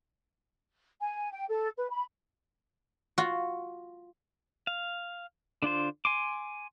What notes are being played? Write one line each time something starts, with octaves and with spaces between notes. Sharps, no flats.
G#5
G5
A4
B4
B5
F4 F#4
F5
D3 D4 F4 C5
G#5 C6 D6